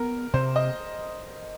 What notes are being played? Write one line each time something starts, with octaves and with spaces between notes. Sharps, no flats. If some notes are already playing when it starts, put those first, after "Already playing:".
Already playing: B3 A#4
C3 C5
D#5